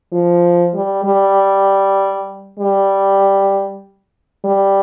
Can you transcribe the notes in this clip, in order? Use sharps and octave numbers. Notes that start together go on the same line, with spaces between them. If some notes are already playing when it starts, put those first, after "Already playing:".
F3
G3
G3
G3
G3